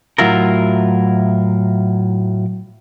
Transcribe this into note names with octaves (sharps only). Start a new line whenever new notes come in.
A2 F#3 E4 F4 A#4